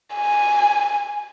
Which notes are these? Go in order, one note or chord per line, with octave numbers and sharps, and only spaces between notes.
G#5